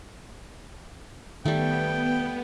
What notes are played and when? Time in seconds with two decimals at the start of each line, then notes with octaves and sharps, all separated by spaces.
1.45 D#3 G3 A3 B3 G5